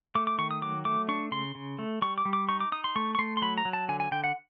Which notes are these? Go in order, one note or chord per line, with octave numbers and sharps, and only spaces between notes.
A3 D6
D6
D#3 C#6
D#6
F#3 D6
A3 D6
D4 C#6
C#3 C6
C#3
A3
G3 C#6
D6
G3
D6
D#4 C#6
D6
D#4 D#6
C6
A3 C#6
C#6
A3 C6
C6
F#3 B5
A#5
F#3
A5
D3 G#5
G#5
D3 G5
F#5